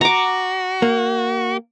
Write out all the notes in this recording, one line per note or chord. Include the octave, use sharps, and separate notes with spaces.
F#4 A#5 D6
A#3